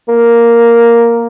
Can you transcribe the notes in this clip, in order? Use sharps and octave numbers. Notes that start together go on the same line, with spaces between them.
A#3